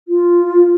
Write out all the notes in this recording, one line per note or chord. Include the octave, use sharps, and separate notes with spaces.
F4